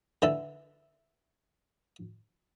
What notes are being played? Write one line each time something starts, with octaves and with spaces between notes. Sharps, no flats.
D3 E3 A4